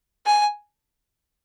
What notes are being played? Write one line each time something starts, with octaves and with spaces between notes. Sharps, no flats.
G#5